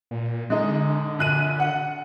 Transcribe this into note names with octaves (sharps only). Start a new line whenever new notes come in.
A#2
D3 G#3 D#4
A#1 F#6 D#7
F#5